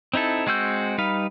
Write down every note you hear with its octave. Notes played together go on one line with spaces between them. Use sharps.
C4 D#4 E4 A4
G#3 C4 F#4 E6 G6
G3 D#4 B4 F5